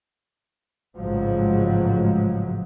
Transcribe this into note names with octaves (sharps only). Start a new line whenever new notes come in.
A1 G#2 C#3 F3 F#3 G#3